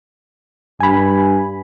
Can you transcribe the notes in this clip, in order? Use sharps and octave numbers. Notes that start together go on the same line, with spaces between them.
G2 G#5 B5